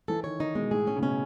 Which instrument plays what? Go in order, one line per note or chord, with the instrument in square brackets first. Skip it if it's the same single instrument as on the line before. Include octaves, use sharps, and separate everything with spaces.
[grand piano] E3 [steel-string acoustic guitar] A4
[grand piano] D#3 [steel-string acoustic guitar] C#5
[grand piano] D#3 [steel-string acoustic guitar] D#4
[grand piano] B2 [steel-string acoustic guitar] G#3
[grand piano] A2 [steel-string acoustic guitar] G#4
[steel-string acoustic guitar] C#4
[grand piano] C#3
[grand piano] B2 [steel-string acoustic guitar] C#4